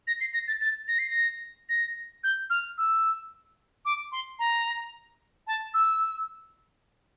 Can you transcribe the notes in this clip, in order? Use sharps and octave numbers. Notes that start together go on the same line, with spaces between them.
A#6
C7
A#6
A6
A6
A#6
C7
A#6
A#6
G6
F6
E6
D6
C6
A#5
A5
E6